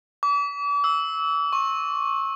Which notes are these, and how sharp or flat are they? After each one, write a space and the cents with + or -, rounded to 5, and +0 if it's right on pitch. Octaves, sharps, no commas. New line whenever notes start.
D6 -40
E6 -20
C#6 -30